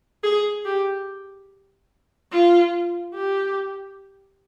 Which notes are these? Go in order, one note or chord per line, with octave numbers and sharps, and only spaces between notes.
G#4
G4
F4
G4